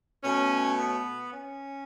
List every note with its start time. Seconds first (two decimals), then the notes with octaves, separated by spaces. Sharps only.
0.23 B2 A3 C#4
0.77 B3
1.32 C#4